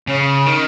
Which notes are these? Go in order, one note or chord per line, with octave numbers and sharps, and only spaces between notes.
C#3
D#3